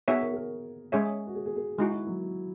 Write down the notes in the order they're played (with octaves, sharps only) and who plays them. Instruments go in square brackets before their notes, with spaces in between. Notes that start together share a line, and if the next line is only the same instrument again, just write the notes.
[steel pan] B3 D#4 F#4 C#5 E5 [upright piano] G#4
[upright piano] A#4
G#4
A#4
[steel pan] G#3 C#4 G#4 C#5 E5
[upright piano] F#4
G#4
G#4
G#4
[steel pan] G#3 D#4 F#4 [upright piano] E4
[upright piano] E4
F#3